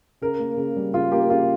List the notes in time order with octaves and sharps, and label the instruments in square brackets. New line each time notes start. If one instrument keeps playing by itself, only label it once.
[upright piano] C#3 A#4
A#3
C#3
G3
C#3 F4
A#3 G4
C#3 F4